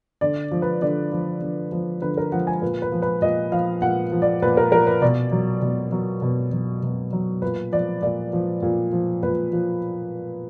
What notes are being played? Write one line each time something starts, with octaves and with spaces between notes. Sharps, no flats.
D3 D5
F3
B4
D3 D5
F3
D3
F3
D3 B4
A#4
F3 F#5
G#5
A#2 B4
B4
F3
B4
A#2 D#5
F3 F5
A#2 F#5
F3
D5
A#2 B4
A#4
F3 A#4
B4
B2 D5
F#3
B2
F#3
B2
F#3
B2
F#3
A#2 B4
F3 D5
A#2 D5
F3
A#2
F3
A#2 B4
F3